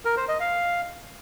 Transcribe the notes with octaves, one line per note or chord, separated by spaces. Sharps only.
A#4
C5
D#5
F5